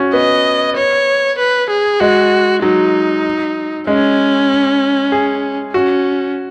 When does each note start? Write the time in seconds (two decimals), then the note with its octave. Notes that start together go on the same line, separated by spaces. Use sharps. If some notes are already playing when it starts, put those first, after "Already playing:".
Already playing: C#4 F#4
0.13 B3 D#5
0.77 C#5
1.38 B4
1.70 G#4
2.00 G#3 F#4
2.62 F#3 D#4
3.87 G#3 C#4
5.12 G#4
5.74 C#4 F#4